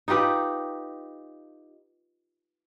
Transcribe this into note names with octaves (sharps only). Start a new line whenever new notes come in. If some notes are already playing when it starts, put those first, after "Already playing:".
D#4 F4 G4 B4